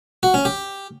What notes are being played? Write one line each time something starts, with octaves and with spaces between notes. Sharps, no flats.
F#4
C#4
G4